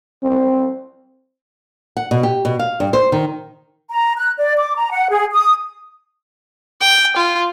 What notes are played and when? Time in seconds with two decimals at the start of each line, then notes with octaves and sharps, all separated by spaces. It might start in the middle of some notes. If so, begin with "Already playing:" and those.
0.23 C4
1.97 F#5
2.11 B2
2.23 G4
2.45 B2
2.59 F5
2.80 G2
2.93 C5
3.12 D#3
3.89 A#5
4.16 F#6
4.37 D5
4.57 D6
4.74 A#5
4.92 F#5
5.10 G#4
5.33 D#6
6.81 G5
7.16 F4